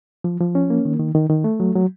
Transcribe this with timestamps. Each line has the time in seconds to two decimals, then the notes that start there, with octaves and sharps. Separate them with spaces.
0.24 F3
0.40 F3
0.55 C#4
0.70 A#3
0.85 D#3
0.99 D#3
1.15 D#3
1.29 D#3
1.44 A3
1.60 F#3
1.76 F#3